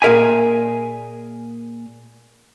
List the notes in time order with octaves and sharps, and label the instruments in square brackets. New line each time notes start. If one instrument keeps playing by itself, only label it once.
[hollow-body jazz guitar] A#2 G#4 A#4 E5 G#5